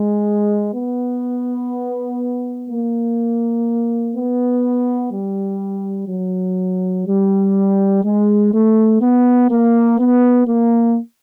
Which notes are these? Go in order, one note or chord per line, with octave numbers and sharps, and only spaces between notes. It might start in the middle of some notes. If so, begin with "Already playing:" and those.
Already playing: G#3
B3
A#3
B3
G3
F#3
G3
G#3
A3
B3
A#3
B3
A#3